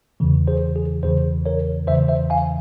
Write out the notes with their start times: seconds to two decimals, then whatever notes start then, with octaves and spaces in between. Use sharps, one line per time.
0.20 E2 C#3 E3
0.48 G#4 C5
0.76 G#4
1.03 E2 C#3 E3 G#4 C5
1.46 A#4 C#5
1.87 E2 C#3 E3 C5 E5
2.08 C5 E5
2.30 F5 G#5